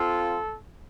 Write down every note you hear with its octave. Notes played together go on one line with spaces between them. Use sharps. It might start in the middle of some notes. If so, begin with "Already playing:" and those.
Already playing: C4 F4 A4